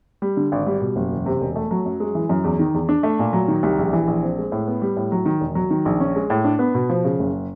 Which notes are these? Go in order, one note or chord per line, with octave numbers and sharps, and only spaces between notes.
G3
D3
G#1
G3
B2
F#1
E1
C3
E1
A3
F#3
F#2
G#3
E3
F#2
E2
D#3
E2
D4
A3
A#2
F#3
D#3
C2
A#1
E3
A#1
C4
G#3
A2
B3
G3
A2
F#3
D#3
E1
F#3
D#3
A#1
C#4
G#3
A2
D4
B3
B2
F3
C#3
F#1